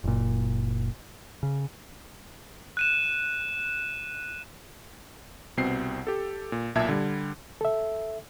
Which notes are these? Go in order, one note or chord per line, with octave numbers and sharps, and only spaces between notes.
F#1 A#2
C#3
F#6 D#7 E7
C2 B2 C4 C7
G4 A4
A#2
B1 A#2 E5 A5 G#6
D3 G3
A4 E5